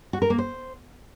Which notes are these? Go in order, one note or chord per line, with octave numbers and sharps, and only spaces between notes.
F#4
A#4
A#3
C5